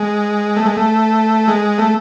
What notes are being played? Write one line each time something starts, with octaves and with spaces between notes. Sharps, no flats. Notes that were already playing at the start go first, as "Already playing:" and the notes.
Already playing: G#3
A3
G#3
A3
G#3
A3